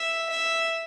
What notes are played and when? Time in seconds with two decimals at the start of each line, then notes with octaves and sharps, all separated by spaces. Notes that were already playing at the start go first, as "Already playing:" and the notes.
Already playing: E5
0.30 E5